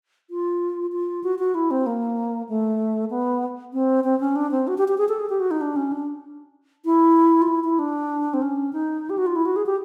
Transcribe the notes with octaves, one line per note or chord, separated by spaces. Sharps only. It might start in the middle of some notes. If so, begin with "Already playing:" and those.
F4
F4
F#4
F#4
E4
C4
A#3
A3
B3
C4
C4
C#4
D4
C4
F#4
G4
G4
G#4
A4
G#4
G4
F#4
D#4
D4
C#4
D4
E4
F4
E4
E4
D4
C4
C#4
D#4
G4
F#4
F4
E4
F#4
G#4
G4